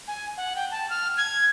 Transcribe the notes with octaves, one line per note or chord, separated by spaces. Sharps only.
G#5
F#5
G5
A5
F6
G#6